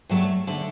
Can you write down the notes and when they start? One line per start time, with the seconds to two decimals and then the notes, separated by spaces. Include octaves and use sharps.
0.09 G2 F#3 A3
0.47 D3 A3